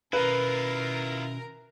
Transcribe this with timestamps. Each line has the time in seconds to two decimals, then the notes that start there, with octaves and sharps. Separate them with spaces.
0.13 B2 D#3 C#4 E4 F4 A#4 B4